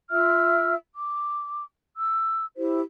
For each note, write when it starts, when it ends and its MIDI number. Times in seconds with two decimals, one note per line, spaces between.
0.11 0.75 65
0.11 0.75 76
0.11 0.75 88
0.11 0.75 89
0.95 1.64 86
1.96 2.45 88
2.57 2.80 64
2.57 2.80 67
2.57 2.80 72